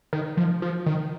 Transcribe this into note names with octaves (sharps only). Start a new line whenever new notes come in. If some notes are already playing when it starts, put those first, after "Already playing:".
D#3
F3
F3
D#3